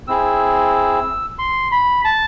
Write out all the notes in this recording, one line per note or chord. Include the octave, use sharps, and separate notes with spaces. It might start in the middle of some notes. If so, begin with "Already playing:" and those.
C4 E4 G#4 E6
C6
B5
A5